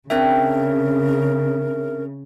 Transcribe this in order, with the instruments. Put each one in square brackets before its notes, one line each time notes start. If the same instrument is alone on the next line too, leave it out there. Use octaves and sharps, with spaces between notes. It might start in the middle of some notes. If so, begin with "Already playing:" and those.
[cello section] C#3 [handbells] C4 D4 E5 [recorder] A#4 [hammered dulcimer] G5